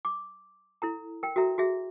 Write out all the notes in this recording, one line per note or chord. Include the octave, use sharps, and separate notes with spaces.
D6
E4 A4 A#5
A#4 G5
F#4 A4 E5 A#5
F#4 G#4 E5